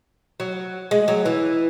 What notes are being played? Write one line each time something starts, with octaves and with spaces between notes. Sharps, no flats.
F#3
G#3
F#3
E3